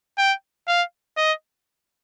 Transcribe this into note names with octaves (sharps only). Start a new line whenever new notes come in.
G5
F5
D#5